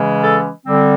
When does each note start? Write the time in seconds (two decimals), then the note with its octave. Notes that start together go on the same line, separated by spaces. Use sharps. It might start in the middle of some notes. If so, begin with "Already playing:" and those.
Already playing: C#3 E3 G#3 C#4
0.22 A4
0.66 D3 G3 C4